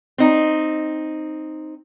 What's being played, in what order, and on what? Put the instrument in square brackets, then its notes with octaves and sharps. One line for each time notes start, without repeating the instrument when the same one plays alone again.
[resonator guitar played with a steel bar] C4 D#4